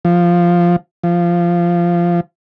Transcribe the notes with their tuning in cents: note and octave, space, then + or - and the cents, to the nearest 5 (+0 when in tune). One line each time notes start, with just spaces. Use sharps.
F3 -5
F3 -15